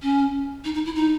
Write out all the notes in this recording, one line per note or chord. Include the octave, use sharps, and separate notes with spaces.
C#4
D#4
D#4
E4
D#4